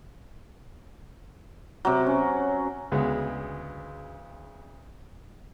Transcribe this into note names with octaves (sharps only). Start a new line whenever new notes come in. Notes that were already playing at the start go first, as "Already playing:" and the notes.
C3 F#3
C#4
D2 C#3 G#3 B3